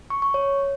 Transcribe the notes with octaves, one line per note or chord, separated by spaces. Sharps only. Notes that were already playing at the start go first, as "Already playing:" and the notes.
C#6
C#6
C#5